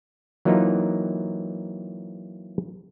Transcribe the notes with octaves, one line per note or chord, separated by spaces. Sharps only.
E3 F#3 A#3 C4 D#4 F4